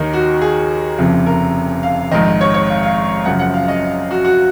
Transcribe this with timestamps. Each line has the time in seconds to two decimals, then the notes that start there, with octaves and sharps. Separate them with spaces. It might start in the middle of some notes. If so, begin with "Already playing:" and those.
Already playing: D#2 D#3 D#4
0.13 F#4
0.42 G#4
0.98 F1 F2 C#3 F3
1.26 A#4
1.83 F5
2.11 A#1 G#2 D#3 D#5
2.41 C#5
2.54 C#5
2.69 F5
2.83 F5
3.25 F#1 F#2 C#3 F3 F#5
3.39 F#5
3.54 F5
3.68 D#5
4.11 F#4
4.25 F#4